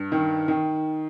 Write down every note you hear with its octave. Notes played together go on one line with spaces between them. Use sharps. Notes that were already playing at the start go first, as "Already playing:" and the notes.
Already playing: G2
D#3
D#3